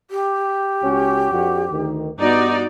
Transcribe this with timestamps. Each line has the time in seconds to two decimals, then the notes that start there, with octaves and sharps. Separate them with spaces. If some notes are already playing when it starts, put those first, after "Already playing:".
0.11 G4
0.83 C#2 C#4 F#4
1.32 F2 D4 F#4
1.72 D2 D#3
2.19 G2 B3 D#4 F#4 D5